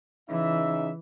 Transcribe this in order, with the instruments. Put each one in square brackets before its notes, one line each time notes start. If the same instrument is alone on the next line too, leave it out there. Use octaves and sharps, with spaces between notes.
[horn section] C#3 D#4 E5 [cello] E3